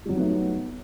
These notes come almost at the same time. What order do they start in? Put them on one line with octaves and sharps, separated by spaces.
G3 F#3 D#4 B3 A3